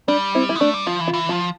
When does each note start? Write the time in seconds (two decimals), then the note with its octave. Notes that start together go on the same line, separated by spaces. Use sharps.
0.08 G3 D4
0.35 C4 E4
0.49 E4
0.56 B3
0.60 A3 D4
0.74 G3
0.86 F3 F4
1.01 E3
1.08 F4
1.14 E3
1.29 F3 F4